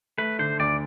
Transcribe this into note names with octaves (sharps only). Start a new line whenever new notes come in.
A3 B4
D3 C5
D2 D5